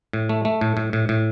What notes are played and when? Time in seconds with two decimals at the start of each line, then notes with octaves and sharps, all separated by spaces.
0.13 A2
0.29 A3
0.45 A3
0.61 A2
0.77 A2
0.93 A2
1.09 A2